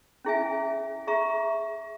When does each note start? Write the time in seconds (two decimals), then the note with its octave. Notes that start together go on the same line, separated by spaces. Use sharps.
0.25 C#4 E4 G#4 E5 G#5
1.07 G#4 E5 A#5 C#6